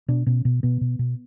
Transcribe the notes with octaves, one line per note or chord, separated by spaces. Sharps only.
B2 D4
B2 C#4
B2
B2 B3
B2
B2